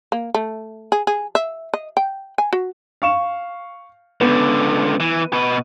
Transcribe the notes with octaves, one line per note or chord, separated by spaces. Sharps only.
A#3
A3
G#4
G#4
E5
D#5
G5
G#5
F#4
F5 C#6 E7
C#2 D3 B3
E3
B2 B4